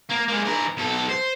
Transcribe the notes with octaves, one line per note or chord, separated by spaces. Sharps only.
A#3
G#3 A#3
E3 A#4
B1 A4
C5